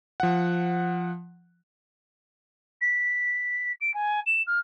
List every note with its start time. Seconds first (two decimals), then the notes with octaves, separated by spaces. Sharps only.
0.20 F3 F#5
2.81 B6
3.80 D7
3.93 G#5
4.26 E7
4.46 F6